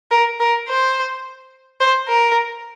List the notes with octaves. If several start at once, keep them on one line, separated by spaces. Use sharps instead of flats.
A#4
A#4
C5
C5
A#4